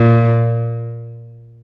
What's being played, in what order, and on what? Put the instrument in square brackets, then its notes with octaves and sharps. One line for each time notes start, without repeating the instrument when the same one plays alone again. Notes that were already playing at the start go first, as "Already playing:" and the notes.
Already playing: [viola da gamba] A#2